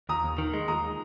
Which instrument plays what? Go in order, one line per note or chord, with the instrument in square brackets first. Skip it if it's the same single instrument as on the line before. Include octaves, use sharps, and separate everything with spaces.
[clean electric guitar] D#2 [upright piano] A#5 D#6
[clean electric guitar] D#2
D#3
G#3
[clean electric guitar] D#2 [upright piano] A#5 D#6